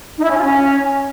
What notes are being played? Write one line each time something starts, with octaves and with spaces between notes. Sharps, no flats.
D#4
E4
C#4
F4
C#4